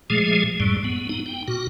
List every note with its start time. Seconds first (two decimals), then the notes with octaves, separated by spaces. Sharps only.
0.10 A#2 F3 G#3 A3 G#4
0.60 F#2 A2 G3
0.84 B3
1.09 B3 D#4
1.26 G5
1.48 A#2 F#4